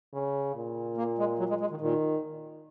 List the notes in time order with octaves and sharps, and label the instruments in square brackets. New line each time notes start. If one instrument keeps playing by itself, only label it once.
[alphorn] C#3
A#2
[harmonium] A#3
G#3
F#3
G#3
G#3
D#3
[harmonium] A#2 [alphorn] D#3